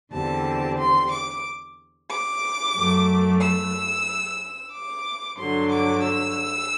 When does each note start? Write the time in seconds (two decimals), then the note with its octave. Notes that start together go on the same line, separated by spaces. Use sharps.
0.13 E2 D3 G3 C4 A5
0.79 C6
1.12 D6
2.10 D6
2.77 F#2 F#3 A3
3.42 E6
4.74 D6
5.39 G2 D3 F#3 C6
5.72 D6
6.05 E6